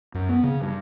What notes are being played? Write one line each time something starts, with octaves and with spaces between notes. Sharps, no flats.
F#2
B3
C#3
G2